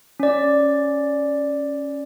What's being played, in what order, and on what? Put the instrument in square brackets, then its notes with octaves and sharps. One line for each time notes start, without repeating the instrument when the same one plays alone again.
[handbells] C#4 D5